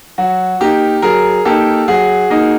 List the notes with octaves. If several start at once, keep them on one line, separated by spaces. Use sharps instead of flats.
F#3 F#4
A#3 D#4 G4
F#3 G#4 A#4
A#3 D#4 G4 A4
F#3 F#4 G#4
A#3 D#4